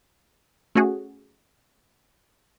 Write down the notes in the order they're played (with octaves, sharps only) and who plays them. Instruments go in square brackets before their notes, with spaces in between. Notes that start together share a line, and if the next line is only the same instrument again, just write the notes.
[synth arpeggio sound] A3 C#4 F#4 G#4